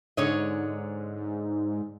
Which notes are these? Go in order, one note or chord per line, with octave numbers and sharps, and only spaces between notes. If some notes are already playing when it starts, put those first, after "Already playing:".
G#2 D3 C#5 D#5